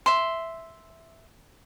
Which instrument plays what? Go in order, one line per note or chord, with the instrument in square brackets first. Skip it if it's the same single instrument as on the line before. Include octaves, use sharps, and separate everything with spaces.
[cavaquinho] E5 C6